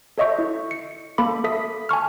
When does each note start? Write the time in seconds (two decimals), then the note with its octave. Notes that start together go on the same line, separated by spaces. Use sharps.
0.18 A4 C#5 D#5 E5 C#6 G6
0.39 E4
0.71 C#7
1.18 A#3 A4 B5 D6
1.44 A4 E5 D#6 B6
1.89 G#5 A5 C#6 F6